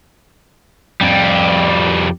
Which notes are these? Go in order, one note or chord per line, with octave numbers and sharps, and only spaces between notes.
F2 G3